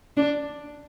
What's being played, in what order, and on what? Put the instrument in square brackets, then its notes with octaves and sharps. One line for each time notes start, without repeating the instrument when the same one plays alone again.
[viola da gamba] D4